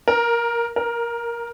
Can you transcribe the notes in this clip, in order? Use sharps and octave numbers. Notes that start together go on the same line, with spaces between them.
A#4
A#4